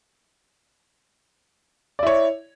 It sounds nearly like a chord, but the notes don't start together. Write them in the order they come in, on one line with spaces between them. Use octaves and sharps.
D5 E4 C#5